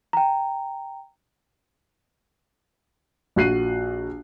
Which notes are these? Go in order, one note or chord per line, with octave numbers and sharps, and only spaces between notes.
G5 A#5
A#1 F#4 F#6 C7 D#7